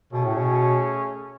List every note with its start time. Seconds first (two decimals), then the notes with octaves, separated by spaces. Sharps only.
0.12 B2 A3 C#4 G#4 C#5
0.25 A2
0.37 B2